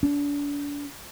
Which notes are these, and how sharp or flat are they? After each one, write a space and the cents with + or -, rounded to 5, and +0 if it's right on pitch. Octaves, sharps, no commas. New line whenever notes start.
D4 -35